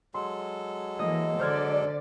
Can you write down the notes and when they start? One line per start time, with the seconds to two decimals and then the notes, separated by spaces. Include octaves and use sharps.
0.14 F#3 G#3 A4 C6
0.99 E3 A#3 D#5
1.40 D3 C5 D5 F6 G#6